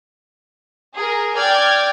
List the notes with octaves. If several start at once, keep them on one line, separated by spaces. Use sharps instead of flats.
G#4 A#4
D5 G5 F6 G#6